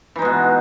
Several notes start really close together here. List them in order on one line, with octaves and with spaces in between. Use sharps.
E3 D#4 G#3 B2